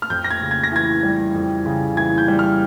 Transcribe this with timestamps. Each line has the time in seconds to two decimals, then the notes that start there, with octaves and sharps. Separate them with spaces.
0.02 F6
0.10 F2 G6
0.24 A#6
0.30 G#6
0.41 C#3
0.51 G#6
0.64 A#6
0.72 E3 G#6
1.03 G3
1.35 F2
1.66 C#3
1.97 E3 G#6
2.18 G6
2.28 G3
2.39 F6